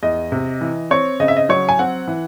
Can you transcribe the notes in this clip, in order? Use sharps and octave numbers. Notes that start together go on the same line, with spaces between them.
E2 D#5
C3
E3
C4 C#5
C#3 D#5
E5
D#5
F#3 C#5
G#5
C4 F#5
E3